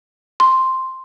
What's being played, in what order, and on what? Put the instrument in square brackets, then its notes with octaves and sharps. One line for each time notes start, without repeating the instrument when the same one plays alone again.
[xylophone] C6